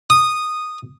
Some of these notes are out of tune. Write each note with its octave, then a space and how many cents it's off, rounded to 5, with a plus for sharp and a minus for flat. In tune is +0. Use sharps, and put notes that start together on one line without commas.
D#6 -10